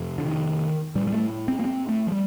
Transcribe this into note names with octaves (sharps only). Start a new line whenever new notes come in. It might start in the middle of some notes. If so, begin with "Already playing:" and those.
Already playing: F2 C3
D3
D#3
A2 G3
G3
A3
C4
A#3
C4
A3
F3
G3